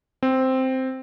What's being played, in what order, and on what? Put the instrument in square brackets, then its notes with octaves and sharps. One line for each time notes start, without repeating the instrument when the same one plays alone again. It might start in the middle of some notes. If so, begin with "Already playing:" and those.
[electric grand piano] C4